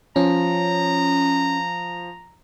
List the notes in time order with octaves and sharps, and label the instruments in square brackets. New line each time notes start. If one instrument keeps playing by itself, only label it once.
[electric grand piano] F3 [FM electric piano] C#4 [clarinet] A#5